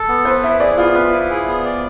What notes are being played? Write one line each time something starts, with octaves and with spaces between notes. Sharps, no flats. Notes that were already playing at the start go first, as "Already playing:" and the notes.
Already playing: A4
B3
B4 C5
E4 E5
G#4 D5
B3 F4
F4 B4
E4
G#4
B3
D5